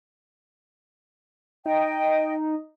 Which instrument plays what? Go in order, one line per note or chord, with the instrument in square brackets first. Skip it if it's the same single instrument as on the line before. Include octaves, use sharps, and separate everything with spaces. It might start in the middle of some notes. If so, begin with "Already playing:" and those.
[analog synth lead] D#4 [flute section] D#5 G5